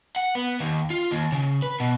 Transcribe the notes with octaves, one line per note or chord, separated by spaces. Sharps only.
F#5
B3
D#2
F4
D#2
C#3
B4
B2